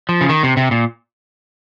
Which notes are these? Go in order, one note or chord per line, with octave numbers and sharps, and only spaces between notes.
F3
C#3
D#3
C3
C3
A#2